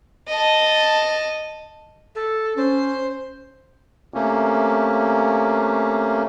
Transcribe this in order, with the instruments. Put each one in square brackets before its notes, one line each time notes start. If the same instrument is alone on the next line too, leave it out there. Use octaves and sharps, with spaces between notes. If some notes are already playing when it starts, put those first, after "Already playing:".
[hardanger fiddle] D#5 A5
[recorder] A4
[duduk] C#4 [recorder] C5
[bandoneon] C3 A3 A#3 C#4